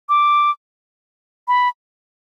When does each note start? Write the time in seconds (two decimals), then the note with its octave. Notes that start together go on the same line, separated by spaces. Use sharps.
0.09 D6
1.48 B5